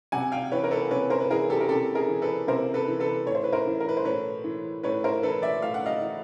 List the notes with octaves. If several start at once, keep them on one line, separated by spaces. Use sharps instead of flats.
C3 F#5 G#5
F5 G5
E3 B4 C#5
A#4
A4 B4
C3 B4 C#5
A#4 C5
B4
E3 G#4 A#4
G4 A4
A#4
C3 G4 A4
G#4 A#4
E3
A4 B4
C3 A#4 C5
A4 B4
E3
A4 B4
A2 C#5
C5
B4
A#4 C5
E3
A#4
B4
C5
A2 B4 C#5
E3
A2 B4 C#5
A#4 C5
E3 A4 B4
D5 E5
A2 F5
F#5
D#5 F5
E3